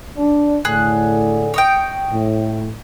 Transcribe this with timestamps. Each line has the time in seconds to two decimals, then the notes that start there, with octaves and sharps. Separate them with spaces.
0.17 D4
0.65 A2 D3 G#4 F#6
1.54 C#5 D#5 G5
2.10 A2